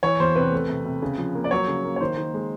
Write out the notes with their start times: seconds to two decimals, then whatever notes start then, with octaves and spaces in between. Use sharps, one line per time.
0.03 E3 C#5
0.20 E2 C5
0.35 C3 B4
0.52 A3
0.69 C3
0.85 C3
1.02 C#3
1.18 F3
1.35 A#3
1.44 D5
1.51 F#3 C#5
1.68 C#3
1.84 A#3
1.96 C#5
2.00 D#3 C5
2.17 D#3
2.34 G#3